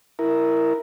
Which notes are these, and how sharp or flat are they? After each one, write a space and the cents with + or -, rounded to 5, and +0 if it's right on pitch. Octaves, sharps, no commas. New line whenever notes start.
E4 +0 A#4 +0